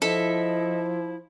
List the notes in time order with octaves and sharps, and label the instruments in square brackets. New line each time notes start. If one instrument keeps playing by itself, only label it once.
[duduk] F3 [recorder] E4 [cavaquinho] A4 E5 [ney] D#5